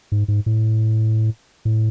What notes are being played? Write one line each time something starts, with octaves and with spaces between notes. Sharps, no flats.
G#2
G#2
A2
A2